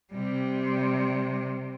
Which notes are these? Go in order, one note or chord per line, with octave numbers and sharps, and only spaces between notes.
C3 G3